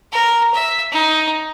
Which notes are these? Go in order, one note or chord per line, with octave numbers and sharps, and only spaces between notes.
A#4
E5
D#4